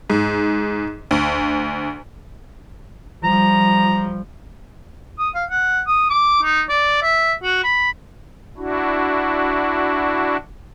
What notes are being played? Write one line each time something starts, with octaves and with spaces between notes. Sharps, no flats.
G#2
D2
F3 G3 A#5
D#6
F5
F#5
D#6
D6
D#4
D5
E5
F#4
B5
D4 E4 F#4